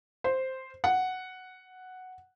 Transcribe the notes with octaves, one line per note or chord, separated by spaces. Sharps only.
C5
F#5